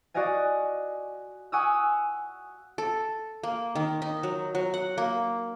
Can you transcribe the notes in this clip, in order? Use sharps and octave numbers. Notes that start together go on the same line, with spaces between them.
F#4 D5 D#5 F5 G#5
F#5 G#5 C#6 D#6 E6
A4
A#3
D#3
D#4
F#3
F#3
F#5
A#3